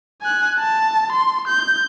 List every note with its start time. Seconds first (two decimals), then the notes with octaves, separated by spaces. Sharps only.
0.21 G#5 F#6
0.59 A5
1.12 C6
1.48 G6